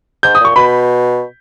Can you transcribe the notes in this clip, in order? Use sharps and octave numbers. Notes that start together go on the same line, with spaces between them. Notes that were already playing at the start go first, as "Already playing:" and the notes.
G#2 G6
D#6
A#2 C#6
B2 B5